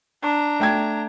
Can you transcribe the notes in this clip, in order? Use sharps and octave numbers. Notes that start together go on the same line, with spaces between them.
D4 A#5
A3 G5 G#6